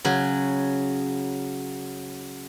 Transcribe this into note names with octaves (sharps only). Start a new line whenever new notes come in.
C#3 F#3